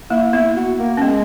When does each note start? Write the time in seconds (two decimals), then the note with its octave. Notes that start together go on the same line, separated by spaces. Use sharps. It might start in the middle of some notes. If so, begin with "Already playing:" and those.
0.10 A#3 E4
0.33 B3 E4
0.56 F#4
0.79 A#3
0.97 C#4
1.02 G#3 B3